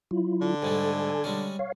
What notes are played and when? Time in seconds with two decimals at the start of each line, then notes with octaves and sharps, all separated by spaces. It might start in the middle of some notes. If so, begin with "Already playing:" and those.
0.11 F#3 E4 F4
0.41 D3
0.62 G#2 G3 A3 A4 G#5
1.24 G3 G#3 C#4
1.59 C#5 F5